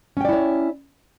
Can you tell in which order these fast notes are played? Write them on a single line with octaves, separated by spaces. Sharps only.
C#4 G5 D5 E4 C#5